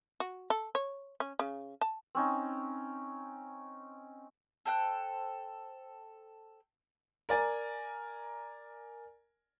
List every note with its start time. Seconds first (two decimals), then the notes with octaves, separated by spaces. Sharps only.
0.20 F#4
0.50 A4
0.75 C#5
1.20 C#4
1.39 C#3
1.81 A5
2.15 C4 C#4 D#4
4.65 A4 C5 G5 F#6
7.29 A#4 D5 G#5 A#5